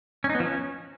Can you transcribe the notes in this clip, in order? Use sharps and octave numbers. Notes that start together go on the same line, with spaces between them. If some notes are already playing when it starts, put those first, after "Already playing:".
C#4
D#4
B3
F3
C#4